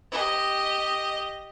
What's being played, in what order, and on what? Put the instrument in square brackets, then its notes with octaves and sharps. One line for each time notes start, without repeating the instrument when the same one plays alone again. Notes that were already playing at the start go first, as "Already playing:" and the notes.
[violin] G4 D#5